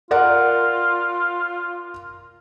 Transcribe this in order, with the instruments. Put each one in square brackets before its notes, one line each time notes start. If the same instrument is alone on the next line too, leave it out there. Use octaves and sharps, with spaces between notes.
[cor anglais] F4 [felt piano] A#4 D5 F#5